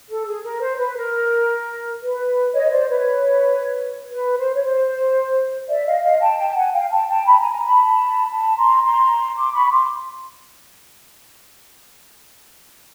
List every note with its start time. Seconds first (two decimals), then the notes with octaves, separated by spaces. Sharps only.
0.08 A4
0.26 G#4
0.43 A#4
0.61 C5
0.79 B4
0.96 A#4
2.01 B4
2.53 C#5 D#5
2.71 C5 D5
2.88 B4 C#5
4.11 B4
4.38 C5
4.55 C#5
4.63 C5
5.69 D5 E5
5.86 D#5 F5
6.03 D#5 F5
6.21 G5 A5
6.38 G5 A5
6.50 A5
6.56 F#5 G#5
6.73 F5 G5
6.91 G5 A5
7.08 G5 A5
7.26 A5 B5
7.39 G#5 A#5
7.52 G#5 A#5
7.65 A5 B5
8.31 A5 B5
8.57 A#5 C6
8.84 A#5 C6
9.36 C6 D6
9.54 B5 C#6
9.71 C6 D6